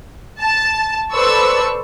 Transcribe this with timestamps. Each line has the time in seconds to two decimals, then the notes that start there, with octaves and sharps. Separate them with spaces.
0.42 A5
1.13 A4 B4 C5 D5 C#6 E6